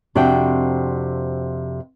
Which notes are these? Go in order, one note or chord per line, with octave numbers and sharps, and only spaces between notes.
F2 C3 D4 F#4 G5